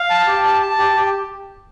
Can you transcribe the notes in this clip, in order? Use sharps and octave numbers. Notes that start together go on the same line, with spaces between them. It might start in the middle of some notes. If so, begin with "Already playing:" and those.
Already playing: F5
A5
G4
A5
A5
G4
G4